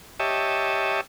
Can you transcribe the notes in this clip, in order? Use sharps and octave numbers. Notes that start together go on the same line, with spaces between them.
G4 C#5 D#5 E5 A5